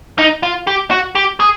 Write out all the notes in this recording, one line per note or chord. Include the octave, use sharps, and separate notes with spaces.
D#4
F4
G4
F#4
G4
G#4